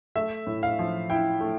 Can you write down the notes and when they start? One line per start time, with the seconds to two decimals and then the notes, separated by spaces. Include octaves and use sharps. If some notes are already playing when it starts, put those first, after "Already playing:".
0.16 A3 E5
0.47 A2
0.63 F5
0.79 F3
1.10 E4 G5
1.40 A3